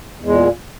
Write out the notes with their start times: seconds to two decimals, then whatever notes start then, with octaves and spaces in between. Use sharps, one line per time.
0.20 E2
0.25 G#3
0.29 A#2